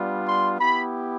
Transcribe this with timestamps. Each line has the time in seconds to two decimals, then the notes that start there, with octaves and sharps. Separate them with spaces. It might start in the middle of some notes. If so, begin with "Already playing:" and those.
Already playing: G3 B3 D4 F4
0.26 C6
0.59 B3 E4 G4 B5